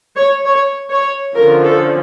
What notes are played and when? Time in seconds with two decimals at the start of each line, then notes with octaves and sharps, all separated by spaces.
0.16 C#5
0.45 C#5
0.90 C#5
1.35 D3 F3 C#4 A#4
1.64 A4